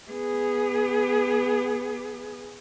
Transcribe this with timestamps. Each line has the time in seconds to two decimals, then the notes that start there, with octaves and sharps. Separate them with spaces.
0.11 B3 G#4